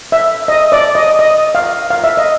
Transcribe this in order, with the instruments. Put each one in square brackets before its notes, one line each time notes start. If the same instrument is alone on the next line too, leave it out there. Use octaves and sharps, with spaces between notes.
[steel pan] E5
D#5
D5
D#5
D#5
F5
F5
E5
D#5